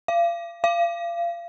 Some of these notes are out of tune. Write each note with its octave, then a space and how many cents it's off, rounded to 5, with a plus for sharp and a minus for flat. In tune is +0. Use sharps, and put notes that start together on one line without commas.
F5 -35
F5 -30